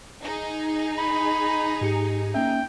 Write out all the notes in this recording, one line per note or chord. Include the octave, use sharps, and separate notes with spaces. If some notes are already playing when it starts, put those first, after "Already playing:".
D#4 G#4
B5
G#2 G4 C#7
A#3 C#4 E5 G5